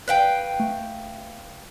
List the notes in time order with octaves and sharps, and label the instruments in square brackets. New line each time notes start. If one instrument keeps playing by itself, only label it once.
[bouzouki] B4 F5 G5
[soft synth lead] A3